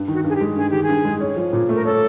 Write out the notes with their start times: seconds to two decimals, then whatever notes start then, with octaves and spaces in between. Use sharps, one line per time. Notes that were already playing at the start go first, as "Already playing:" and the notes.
Already playing: G2
0.08 D#3
0.13 F#4
0.24 G2 G#4
0.35 G4
0.41 G#3
0.56 G2 G#4
0.70 D#3 G4
0.83 G#4
0.89 G2
1.05 G#3
1.20 C#4
1.37 F3
1.53 A#2
1.69 A3 A#4
1.85 C#4 A4